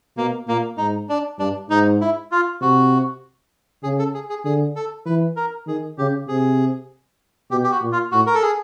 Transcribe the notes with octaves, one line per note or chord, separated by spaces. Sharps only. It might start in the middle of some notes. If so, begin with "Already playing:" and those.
B2 A#3
A#2 A#3
G#2 D#4
D4
G2 D4
G#2 D#4
E4
F4
C3 F#4
C#3 G#4
A4
G#4
G#4
D3 G#4
A4
E3 B4
A#4
D#3 G#4
C#3 G4
C3 G#4
B2 G4
G4
F#4
A#2
F4
A2 F#4
A#4
A4
G#4